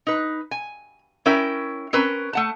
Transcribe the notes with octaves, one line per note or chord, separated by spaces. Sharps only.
D#4 B4
G#5
C#4 E4 A#4 E5 G5
C4 C#4 A#4 B4
A3 F#5 A5